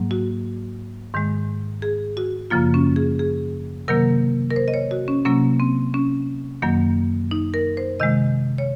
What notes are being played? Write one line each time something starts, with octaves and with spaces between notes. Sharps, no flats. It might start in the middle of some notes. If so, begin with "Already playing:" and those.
Already playing: G#2 F#3 A#3
F#4
G#2 D#3 G#3
G#4
F#4
F#2 C#3 F3 A#3 F4
C#4
G#4
G#4
C3 D#3 F#3 A#3 A#4
A#4
C5
D#5
C#5
F#4
C#4
C3 F#3 A#3 C#4
C4
C#4
F#2 D#3 F#3 A#3
D#4
A#4
C5
C3 D#3 G#3 D#5
C#5